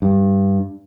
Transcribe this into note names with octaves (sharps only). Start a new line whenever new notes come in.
G2